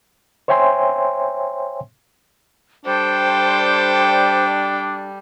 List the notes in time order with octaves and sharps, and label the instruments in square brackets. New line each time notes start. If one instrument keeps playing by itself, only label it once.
[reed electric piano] C5 C#5 E5 G5 G#5 C6
[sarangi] G3 [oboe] D4 [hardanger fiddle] A4 G5 [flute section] C5